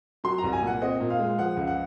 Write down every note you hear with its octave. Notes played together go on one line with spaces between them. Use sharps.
F#3 C6
A#5
C2
G#5
A#2 F#5
C4 D#5
A#2
F5
G#3
F3 F#5
C#2
F#5